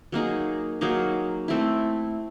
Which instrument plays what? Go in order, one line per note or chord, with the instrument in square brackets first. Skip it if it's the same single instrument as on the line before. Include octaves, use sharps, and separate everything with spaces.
[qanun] F#3 A#3 D#4 G#4
F#3 A#3 D#4 G#4
A3 C4 E4